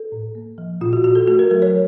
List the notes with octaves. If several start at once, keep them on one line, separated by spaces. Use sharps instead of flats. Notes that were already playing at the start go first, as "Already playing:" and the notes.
Already playing: A4
A2
A#3
F3
A#2 F4
F#4
A#2 F#4
A4
A3 F#4
A#4
F#3 A#4
C#5